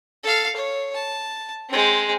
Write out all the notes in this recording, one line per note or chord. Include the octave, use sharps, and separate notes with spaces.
A4 F5
C#5
A5
G#3 C4